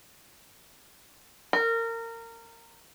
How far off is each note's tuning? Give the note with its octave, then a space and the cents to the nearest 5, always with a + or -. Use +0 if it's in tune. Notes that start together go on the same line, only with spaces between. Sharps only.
A#4 -25